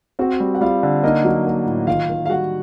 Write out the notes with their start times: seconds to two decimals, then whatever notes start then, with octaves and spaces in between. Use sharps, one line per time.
0.19 C4 F#4 F#5
0.40 G3
0.55 F#5
0.61 G3 F4 F5
0.83 D3
1.03 A#3 D#4 D#5
1.25 F#3
1.45 A#3
1.66 A2
1.87 D#3 F4 F5
2.09 D#3
2.26 F5
2.30 G3 F#4 F#5